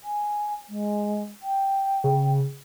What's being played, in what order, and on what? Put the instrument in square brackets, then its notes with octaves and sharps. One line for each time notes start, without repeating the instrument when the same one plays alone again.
[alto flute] G#5
G#3
G5
[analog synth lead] C#3